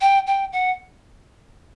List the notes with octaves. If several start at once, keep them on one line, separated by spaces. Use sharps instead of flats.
G5
G5
F#5